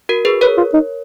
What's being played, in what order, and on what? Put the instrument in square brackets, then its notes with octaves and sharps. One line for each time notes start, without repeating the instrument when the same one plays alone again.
[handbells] F#4 A#4
G#4 B4
[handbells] A#4 C#5 [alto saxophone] B4
[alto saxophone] F4
D#4